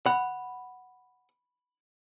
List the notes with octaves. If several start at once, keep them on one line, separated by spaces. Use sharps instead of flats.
F#5 B5